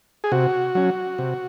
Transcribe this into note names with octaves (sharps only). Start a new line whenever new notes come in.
G#4
C3 F#4
F#3 C#4
C3